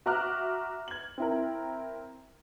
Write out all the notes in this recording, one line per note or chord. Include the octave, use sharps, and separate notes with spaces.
F#4 E5 A#5 D6 F6 F#6
G#6 F#7
C4 E4 A#4